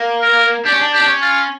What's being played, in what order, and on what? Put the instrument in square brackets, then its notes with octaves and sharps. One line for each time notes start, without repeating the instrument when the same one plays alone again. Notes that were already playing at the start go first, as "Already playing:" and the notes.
Already playing: [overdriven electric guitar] A#3
[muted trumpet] A#4
[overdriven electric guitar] D4 [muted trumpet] G4
[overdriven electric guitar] C#4
D4
[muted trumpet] G4
[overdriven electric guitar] D4
C#4
[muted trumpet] F4